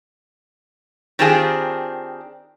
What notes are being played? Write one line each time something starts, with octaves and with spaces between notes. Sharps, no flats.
D#3 C4 D4 F4 G4 G#4